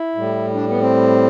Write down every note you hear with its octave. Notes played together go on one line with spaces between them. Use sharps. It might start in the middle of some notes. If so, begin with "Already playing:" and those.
Already playing: E4
A2 G3
D4
B3
C4